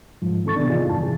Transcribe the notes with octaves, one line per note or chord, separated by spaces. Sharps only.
G#2 F3
D#3 C4 A4 C#6 A6
C3 E3 B3 D4
D#4 F4 G#4 D5
E2 G2 E3 A5
C3 E3 G#4